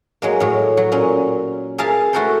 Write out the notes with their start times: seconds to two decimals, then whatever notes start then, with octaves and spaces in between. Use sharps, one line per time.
0.22 F#3 G#3 A#3
0.40 A2 F#3
0.77 F#3
0.92 A#2 A#3 C#4
1.78 G#4 A#4 E5 F5 G#5 A5
2.13 A3 E4 F#4 A4 A#4 C5